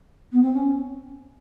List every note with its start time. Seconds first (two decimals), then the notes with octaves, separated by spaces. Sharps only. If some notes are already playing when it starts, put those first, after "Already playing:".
0.32 B3
0.42 C4
0.54 C#4